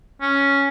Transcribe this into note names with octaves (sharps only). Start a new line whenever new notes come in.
C#4